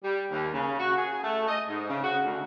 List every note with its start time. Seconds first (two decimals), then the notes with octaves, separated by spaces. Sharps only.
0.04 G3
0.31 D#2
0.53 C#3
0.79 F#4
0.96 G#4
1.23 A3
1.48 D#5
1.68 G#2
1.89 C#3
2.04 F#4
2.24 D2